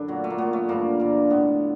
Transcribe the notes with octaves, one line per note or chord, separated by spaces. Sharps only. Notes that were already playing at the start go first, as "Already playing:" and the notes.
Already playing: F#2 D3 D4 E4
A#2 F#3
A3
A#3
A#2 F#3 B3
A3
G2 D3 F3 A#3
G2 D3 F3
A2 F3 B3